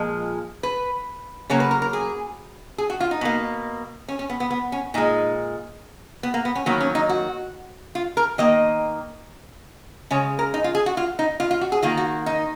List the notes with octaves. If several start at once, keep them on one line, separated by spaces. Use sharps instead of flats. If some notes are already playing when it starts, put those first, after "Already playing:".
Already playing: A#2 F3 G#3
B4
C#3 F#3 A#3 C#5
B4
A#4
A#4
G#4
G#4
F#4
F4
D#4
B2 A#3
C#4
C#4
B3
B3
B3
C#4
A#2 G#3 D#4
B3
A#3
B3
C#4
D#3 F#3 A#3 B3
C#4
D#4
F#4
F4
A#4
D#3 A#3 D#5
C#3 G#3 C#5
A#4
D#4
F4
G#4
F#4
F4
D#4
F4
F4
F#4
G#4
D#3 A#3 F4
F#4
D#4